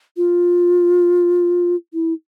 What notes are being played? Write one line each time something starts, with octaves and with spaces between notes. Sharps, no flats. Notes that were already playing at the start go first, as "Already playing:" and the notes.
F4
E4